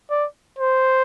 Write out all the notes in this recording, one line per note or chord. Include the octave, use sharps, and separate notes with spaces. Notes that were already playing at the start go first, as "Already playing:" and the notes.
D5
C5